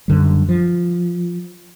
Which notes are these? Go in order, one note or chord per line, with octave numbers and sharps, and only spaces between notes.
F#2 D3 G3
F3